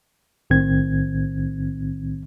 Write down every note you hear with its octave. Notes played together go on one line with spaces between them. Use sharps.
B1 A2 D#3 C4 G#6